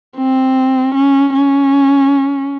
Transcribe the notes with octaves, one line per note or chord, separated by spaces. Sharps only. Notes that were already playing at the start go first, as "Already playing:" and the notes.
C4
C#4
C#4